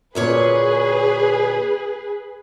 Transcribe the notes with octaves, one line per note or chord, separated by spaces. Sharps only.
D2 A#2 G#4 B4 C#5